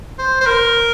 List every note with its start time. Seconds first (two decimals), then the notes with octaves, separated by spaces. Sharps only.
0.18 C5
0.41 C5
0.46 A#4